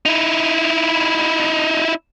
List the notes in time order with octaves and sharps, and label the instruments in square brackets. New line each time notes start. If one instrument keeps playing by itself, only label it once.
[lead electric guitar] D#4 E4